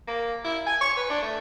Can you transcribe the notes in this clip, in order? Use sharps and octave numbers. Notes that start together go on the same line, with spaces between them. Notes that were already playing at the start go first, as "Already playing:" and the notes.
A#3
E4
G#5
C#6
B4
D4
A3